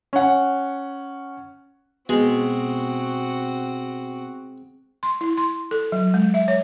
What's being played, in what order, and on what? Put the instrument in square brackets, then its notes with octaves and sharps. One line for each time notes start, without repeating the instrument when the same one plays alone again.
[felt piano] C#4 F#5
[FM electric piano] B2 [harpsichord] G#3 [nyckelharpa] C4 F#4
[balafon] C6
E4
C6
A4
F#3
G#3
E5
C#5